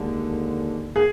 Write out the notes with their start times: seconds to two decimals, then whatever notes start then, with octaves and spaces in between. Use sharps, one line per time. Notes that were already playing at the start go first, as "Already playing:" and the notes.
Already playing: D#2 D3 G#3
0.96 G#4